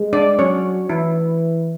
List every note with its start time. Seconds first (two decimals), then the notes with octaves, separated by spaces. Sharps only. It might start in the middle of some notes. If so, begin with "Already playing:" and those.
Already playing: G#3
0.13 D4 D5
0.39 F#3 C#4 C#5
0.89 E3 E4